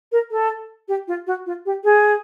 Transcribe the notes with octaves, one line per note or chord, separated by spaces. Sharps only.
A#4
A4
G4
F4
F#4
F4
G4
G#4